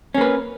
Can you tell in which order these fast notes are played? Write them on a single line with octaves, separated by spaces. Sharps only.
C#4 A#3 B4